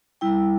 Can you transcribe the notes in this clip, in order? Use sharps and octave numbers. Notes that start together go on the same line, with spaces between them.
G3 E4 G5